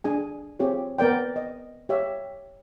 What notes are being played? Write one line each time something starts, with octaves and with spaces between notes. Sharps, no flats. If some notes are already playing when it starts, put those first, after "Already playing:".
D4 G#4 G#5
C4 F4 G4 G#4 C#5
B3 A#4 D5 G5
D#5
G4 C#5 E5 F5